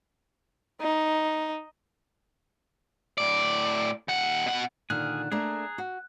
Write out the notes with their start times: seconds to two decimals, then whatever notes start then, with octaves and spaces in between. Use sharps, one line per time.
0.81 D#4
3.18 A2 D5
4.08 D#2 F#5
4.46 B2 F#5
4.90 A#2 D3 D#3 G#4 F6 F#6
5.32 A3 A#3 D4 G#4 A#5
5.78 F#4